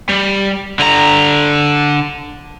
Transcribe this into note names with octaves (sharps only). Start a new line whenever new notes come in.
G3
D3 A#5